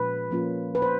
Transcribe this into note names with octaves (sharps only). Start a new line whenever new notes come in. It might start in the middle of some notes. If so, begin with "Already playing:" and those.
Already playing: A#2 F3 G#3 C#4 B4
F3 A#3 C#4 F4
B4
C5